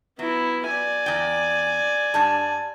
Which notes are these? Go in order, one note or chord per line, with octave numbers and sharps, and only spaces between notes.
F#3 B3 E4
D5 G#5
E2 G5
G2 G3 A5